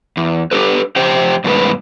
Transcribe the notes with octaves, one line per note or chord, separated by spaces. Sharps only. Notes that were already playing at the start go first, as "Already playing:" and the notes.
E2
D4 G4 A4 B4
F2 G4 C5 G5
G2 B2 D#3 G#3 F#4 B4